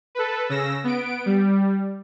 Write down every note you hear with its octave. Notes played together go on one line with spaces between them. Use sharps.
A4 B4
C#3 E6 A#6
B3 D7
G3